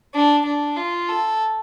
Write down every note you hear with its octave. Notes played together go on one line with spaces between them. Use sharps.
D4
D4
F4
A4